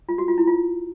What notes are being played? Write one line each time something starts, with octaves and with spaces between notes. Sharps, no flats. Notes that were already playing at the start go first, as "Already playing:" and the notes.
F4
F#4
F4
E4
F4